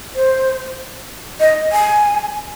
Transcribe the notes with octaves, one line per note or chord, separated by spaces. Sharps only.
C5
D#5
G#5